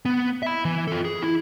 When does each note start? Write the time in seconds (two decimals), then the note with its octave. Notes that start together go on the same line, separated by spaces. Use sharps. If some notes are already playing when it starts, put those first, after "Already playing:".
0.05 B3
0.42 E5 B5
0.65 E3
0.88 F4 A4
1.05 G#4
1.22 E4